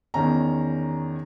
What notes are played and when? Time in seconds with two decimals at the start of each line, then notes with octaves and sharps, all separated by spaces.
0.14 E2 D#3 C#4 A#5